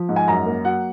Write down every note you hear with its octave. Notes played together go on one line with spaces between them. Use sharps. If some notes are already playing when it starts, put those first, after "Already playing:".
Already playing: F3
G#2
G#5
F#2 A#5
A#3
F#3 F#5